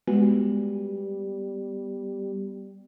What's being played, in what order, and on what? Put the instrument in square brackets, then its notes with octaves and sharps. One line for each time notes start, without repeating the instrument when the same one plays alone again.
[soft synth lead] G3 [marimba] G#3 F#4 [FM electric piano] B3